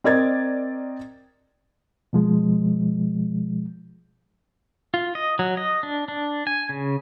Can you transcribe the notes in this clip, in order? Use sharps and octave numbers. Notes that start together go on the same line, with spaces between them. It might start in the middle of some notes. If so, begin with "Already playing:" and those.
C4 A#4 D5 D#5 G#6 A6
B2 F3 G#3
F4
D#5
F#3
D#5
D4
D4
G#5
C#3